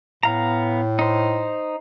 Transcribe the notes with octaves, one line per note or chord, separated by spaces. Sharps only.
A2 B3 F5 A#5
D#4 C5